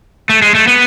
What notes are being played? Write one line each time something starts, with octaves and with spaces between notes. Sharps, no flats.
A3
G#3
A3
B3